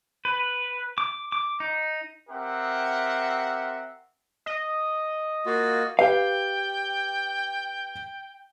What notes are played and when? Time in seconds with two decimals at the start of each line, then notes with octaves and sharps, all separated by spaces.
0.25 B4
0.98 D6
1.32 D6
1.60 D#4
2.30 C4 G4 A#4 E5 F#5
4.46 D#5
5.46 A#3 F4 F#4
5.99 G4 B4 F5 G5